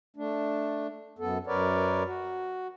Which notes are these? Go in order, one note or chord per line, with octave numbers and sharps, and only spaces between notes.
A3 D4
F#2 B3 A4
F#2 A#4 B4 C#5 D5
F#4